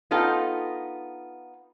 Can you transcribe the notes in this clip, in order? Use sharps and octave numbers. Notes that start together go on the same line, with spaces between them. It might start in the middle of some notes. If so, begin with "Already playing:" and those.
B3 D#4 F4 A4 G5